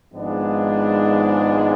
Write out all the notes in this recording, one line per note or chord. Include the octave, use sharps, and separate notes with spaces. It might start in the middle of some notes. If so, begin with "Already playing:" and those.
G#1 G#2 F3 G#3 B3 D4